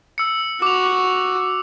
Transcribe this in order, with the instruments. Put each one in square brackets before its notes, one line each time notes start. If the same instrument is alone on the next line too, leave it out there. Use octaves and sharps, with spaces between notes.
[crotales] E6 C#7
[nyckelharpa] F#4 [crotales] D6 F7